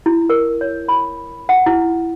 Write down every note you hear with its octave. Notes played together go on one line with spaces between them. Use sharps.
E4
A#4
C#5
B5
F#5
E4